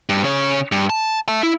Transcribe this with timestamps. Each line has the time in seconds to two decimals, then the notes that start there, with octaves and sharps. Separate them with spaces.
0.09 G2
0.24 C#3 C#5
0.72 G2
0.90 A5
1.28 E5 A5
1.43 E4